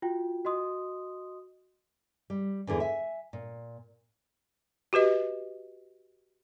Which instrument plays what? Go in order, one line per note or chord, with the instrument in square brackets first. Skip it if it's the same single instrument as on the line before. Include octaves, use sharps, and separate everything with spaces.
[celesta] F4 F#4 G5
F#4 D#5 C6 D#6
[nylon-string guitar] G3
E2 D3 E3 G#4
E5 G#5
A#2
[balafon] F#4 G4 B4 D#5